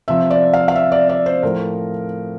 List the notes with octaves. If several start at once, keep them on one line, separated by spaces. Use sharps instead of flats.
C3 F3 E5
D5
F5
F5
E5
D5
D5
C5
A2 F3 A#4